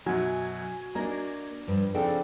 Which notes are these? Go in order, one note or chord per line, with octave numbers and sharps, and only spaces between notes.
F#2 B2 F#3 F#4 G#5 G#6
A#3 D4 A#4 D#5 A#5
G2 F3
C#3 F3 C4 D4 G#4 A4 G5